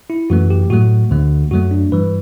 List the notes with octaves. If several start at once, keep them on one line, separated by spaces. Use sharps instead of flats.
E4
F#2 E3 A3 F#4
G4
A2 F#3 A3 F#4
D2 D3 A3
F#2 F#3 A3 F#4
D4
G2 E3 G3 B4